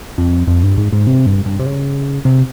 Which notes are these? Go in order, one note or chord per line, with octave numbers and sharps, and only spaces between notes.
F2
F2
G2
G#2
G#2
C3
G2
G2
C3
C#3
C3